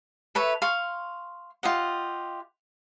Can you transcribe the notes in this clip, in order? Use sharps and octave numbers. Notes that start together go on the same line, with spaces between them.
A4 B4 C#5 E5
F5 C6 C#6
F4 G4 D#5 F#5